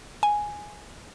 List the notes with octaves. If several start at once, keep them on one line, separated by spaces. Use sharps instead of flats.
G#5